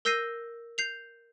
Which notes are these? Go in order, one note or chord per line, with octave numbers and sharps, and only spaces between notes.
A#4 E6 G6 A#6 C7 D#7
G6 C7 F7